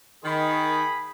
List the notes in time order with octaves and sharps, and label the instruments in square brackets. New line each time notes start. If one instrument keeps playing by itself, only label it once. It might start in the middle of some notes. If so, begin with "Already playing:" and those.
[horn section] D#3 [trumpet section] G#4 B5